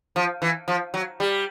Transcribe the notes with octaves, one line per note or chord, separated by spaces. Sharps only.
F3
E3
F3
F#3
G3